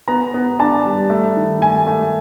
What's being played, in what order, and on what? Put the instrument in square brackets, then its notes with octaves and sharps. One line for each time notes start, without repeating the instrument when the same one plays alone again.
[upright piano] B3 A#5
B3
D4 A5
G3
A3
D#3
A3 G#5
A3